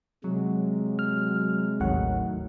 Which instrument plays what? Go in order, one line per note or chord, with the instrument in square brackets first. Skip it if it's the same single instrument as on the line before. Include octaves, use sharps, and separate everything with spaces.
[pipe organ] C3 G#3 [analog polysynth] F#3
[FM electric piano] F6
[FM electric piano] A1 D#2 F#5 [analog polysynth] A2 D#3 F#3